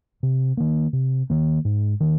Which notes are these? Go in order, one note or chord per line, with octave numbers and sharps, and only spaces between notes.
C3
D#3 A#3
C3
D#3 A#3
G#2
D#3 A#3